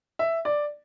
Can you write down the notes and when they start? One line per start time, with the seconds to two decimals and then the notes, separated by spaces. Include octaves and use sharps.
0.19 E5
0.45 D5